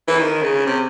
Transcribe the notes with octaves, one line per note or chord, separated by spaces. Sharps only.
E3
D#3
C#3
C3